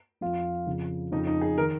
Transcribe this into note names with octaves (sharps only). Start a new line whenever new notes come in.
F2 F3 F4
F2 C#3 F3
F2 C#3 F3 D#4
D#4
G#4
D#3 A#4